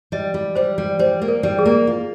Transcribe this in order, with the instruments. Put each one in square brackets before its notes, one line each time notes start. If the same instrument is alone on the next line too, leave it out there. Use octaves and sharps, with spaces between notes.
[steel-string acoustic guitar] G3 [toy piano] D#5
[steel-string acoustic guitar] G3
[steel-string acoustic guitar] G3 [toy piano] C5
[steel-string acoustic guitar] G3
[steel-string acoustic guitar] G3 [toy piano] C5
[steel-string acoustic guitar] A#3
[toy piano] A#4
[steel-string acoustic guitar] G3
[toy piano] G#4
[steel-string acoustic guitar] A#3
F4